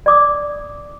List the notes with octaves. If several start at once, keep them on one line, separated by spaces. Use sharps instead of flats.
D5 D6 D#6